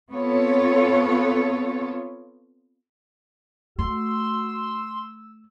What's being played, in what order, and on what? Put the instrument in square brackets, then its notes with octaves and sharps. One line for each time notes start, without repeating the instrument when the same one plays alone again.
[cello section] B3 C4 F4 A4 C#5
[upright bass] A3 [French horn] F#4 [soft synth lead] C6 [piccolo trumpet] E6